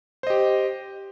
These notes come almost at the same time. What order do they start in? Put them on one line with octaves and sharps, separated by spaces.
C5 D#5 G4